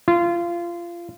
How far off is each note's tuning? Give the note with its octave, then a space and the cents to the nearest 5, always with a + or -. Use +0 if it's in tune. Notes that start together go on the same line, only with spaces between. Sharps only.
F4 -25